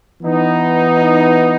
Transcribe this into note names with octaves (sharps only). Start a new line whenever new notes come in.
E3 B3 D#4